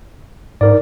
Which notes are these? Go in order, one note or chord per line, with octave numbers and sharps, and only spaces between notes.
G#2 D#4 A#4 D5